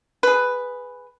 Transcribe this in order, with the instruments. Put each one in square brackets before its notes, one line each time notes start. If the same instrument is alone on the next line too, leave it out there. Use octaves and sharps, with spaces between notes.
[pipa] G#4 B4